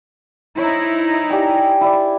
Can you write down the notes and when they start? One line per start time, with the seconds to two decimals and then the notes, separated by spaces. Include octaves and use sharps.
0.57 D#4 E4 C5 C#5
1.30 G4 D5 G#5
1.81 E4 D5